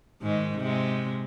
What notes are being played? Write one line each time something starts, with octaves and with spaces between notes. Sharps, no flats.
G#2 D#3 G#3
C3 G#3